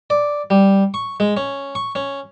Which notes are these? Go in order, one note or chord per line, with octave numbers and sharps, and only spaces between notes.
D5
G3
C#6
G#3
C#4
C#6
C#4